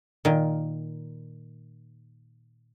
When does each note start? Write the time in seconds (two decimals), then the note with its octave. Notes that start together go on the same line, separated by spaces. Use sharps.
0.25 A#2 D#3